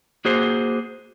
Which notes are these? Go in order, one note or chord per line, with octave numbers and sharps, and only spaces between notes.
A#3 F#4 G#4 C5